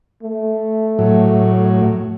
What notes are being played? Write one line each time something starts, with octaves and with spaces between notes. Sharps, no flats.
A3
A2 F#3